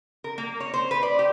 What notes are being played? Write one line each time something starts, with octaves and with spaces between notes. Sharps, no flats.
A#4
A#3
C#5
C5
B4
D5
G4